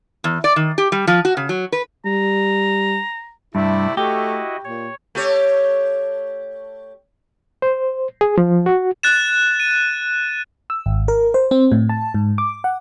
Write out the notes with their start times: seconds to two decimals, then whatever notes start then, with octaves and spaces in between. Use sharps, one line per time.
0.24 E2
0.44 D5
0.56 D#3
0.78 G4
0.92 G3
1.07 F3
1.25 F#4
1.37 C#3
1.49 F#3
1.72 B4
2.05 G3 A#5
3.55 G2 C3 A3 E4 D5
3.97 A3 E4 F#4 G4 D#5
4.65 A#2 C#5
5.15 A3 G4 C#5
7.62 C5
8.21 G#4
8.38 F3
8.66 F#4
9.03 F#6 A6 E7
9.60 D#7
10.70 E6
10.86 G#1
11.08 A#4
11.34 C5
11.51 C4
11.72 A2
11.89 A5
12.14 G#2
12.38 D6
12.64 F#5